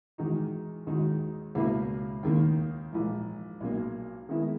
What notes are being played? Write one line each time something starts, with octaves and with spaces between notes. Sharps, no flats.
E2 D#3 G#3 D#4 F#4
D#2 D#3 G#3 D#4 F#4
C#2 B2 A#3 E4
D#2 D#3 A#3
A#1 G#2 E3
B1 B2 A#3
D#3 G#3 B3 E4 A#4